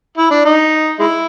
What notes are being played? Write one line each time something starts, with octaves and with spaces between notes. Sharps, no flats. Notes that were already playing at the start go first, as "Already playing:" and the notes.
E4
D4
D#4
G#3 E4